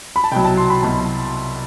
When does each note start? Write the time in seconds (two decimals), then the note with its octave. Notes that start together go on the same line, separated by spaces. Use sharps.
0.16 B5
0.24 A5
0.32 C2 G5
0.34 B2 F#3
0.44 A5
0.57 C6
0.70 B5
0.83 C2 B2 F#3 A5